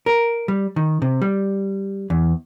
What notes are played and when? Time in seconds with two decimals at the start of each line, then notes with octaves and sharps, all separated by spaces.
0.06 A#4
0.48 G3
0.76 D#3
1.02 C3
1.22 G3
2.10 E2